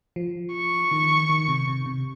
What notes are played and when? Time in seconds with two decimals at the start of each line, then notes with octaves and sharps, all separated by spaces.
0.16 F3
0.53 C#6
0.91 D#3
1.30 D#3
1.48 C3
1.68 C3
1.86 C3